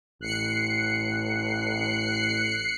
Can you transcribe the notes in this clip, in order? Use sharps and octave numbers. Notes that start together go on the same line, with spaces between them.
A1 F#6 C7 C#7